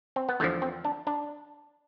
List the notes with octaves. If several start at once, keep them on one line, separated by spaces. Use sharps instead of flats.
C4
B3
E2 D3 F3 A3
C4
D4
D4